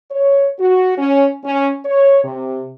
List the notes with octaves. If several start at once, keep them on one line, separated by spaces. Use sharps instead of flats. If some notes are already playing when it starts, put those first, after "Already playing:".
C#5
F#4
C#4
C#4
C#5
C3